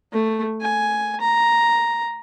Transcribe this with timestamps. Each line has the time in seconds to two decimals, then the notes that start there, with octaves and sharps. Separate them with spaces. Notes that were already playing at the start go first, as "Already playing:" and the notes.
0.12 A3
0.61 G#5
1.20 A#5